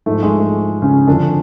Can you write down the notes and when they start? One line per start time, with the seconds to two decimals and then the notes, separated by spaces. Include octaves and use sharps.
0.06 G#2 F3 A3
0.23 G#3
0.40 A3
0.82 C#3 C#4
1.07 F2 D3 F3 D4